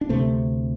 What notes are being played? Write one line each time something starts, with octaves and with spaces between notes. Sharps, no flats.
D4
D2 C3 A3 C4